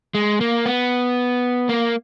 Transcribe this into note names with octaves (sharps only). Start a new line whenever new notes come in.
G#3
A#3
B3
A#3